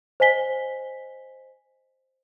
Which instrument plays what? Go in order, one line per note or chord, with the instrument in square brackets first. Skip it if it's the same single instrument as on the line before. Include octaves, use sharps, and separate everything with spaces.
[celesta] C5 D#5 G#5 B6 G7